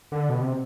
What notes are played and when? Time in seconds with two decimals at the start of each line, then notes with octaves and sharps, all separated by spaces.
0.12 D3
0.29 B2
0.41 C3